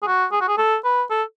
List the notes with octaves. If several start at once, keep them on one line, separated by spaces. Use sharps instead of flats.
G#4
F#4
G#4
F#4
G#4
A4
B4
A4